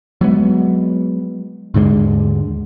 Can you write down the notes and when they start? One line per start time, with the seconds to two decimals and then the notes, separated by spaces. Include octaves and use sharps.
0.21 F#3 G#3 B3
1.74 D#2 G#2 D3 G#3